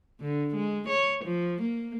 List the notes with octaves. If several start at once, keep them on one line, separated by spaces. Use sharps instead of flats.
D3
G#3
C#5
F3
A#3